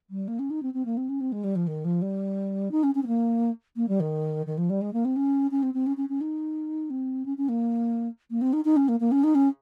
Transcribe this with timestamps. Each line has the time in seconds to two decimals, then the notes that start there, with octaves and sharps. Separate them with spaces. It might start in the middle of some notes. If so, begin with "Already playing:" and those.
0.10 G3
0.28 A#3
0.39 C#4
0.50 D#4
0.63 C4
0.74 C4
0.85 A#3
0.97 C4
1.09 C#4
1.21 C4
1.32 G#3
1.44 G3
1.56 F3
1.67 D#3
1.85 F3
2.02 G3
2.71 D#4
2.83 C#4
2.95 C#4
3.03 C4
3.07 A#3
3.76 A#3
3.88 G3
4.00 D#3
4.46 D#3
4.58 F3
4.70 G3
4.81 G#3
4.93 A#3
5.05 C4
5.16 C#4
5.51 C#4
5.63 C4
5.74 C4
5.86 C#4
5.97 C#4
6.09 C#4
6.21 D#4
6.90 C4
7.26 C#4
7.38 C#4
7.49 A#3
8.30 A#3
8.41 C4
8.53 D#4
8.65 D#4
8.76 C#4
8.88 A#3
9.00 A#3
9.12 C#4
9.24 D#4
9.35 C#4